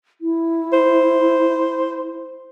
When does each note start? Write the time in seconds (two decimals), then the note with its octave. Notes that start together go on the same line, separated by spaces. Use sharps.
0.21 E4
0.73 C5